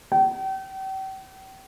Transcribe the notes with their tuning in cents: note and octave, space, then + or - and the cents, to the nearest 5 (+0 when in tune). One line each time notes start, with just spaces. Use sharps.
G5 -40